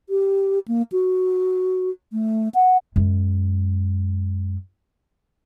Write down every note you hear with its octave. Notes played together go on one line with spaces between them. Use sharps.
G4
A#3
F#4
A3
F#5
F#2 G#3